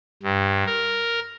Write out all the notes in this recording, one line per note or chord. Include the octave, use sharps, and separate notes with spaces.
G2
A#4